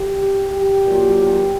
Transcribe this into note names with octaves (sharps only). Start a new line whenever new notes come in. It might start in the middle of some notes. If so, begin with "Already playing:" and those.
Already playing: G4
G4
A#2 F#3